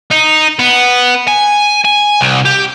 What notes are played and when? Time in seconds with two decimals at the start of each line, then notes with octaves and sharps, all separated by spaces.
0.11 D#4
0.59 B3
1.28 G#5
1.85 G#5
2.21 C2
2.46 G4